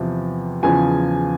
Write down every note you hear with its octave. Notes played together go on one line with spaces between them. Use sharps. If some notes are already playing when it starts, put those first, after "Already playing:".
Already playing: E2 C3 F3
E2 C#3 F3 G#5